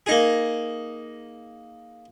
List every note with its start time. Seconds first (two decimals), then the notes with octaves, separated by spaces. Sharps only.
0.06 A#3 D#4 G#4